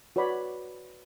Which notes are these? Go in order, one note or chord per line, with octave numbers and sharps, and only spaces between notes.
F#4 B4 C#5 D5 B5